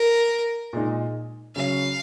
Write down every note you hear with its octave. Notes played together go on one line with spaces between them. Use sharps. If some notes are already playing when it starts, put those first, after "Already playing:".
Already playing: A#4
A#2 G#3 D#4
C#3 F#3 C#4 F5